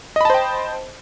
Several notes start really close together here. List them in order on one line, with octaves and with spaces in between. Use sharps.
D#5 B5 A5 C5 G5